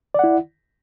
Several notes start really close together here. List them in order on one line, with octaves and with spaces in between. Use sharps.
D5 F#5 E4